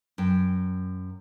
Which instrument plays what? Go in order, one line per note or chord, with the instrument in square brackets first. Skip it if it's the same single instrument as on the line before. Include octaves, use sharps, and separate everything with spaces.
[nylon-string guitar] F#2 G5